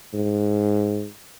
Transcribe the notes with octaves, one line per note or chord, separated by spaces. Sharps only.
G#2